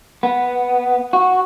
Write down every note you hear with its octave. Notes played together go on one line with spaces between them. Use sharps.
B3
F#4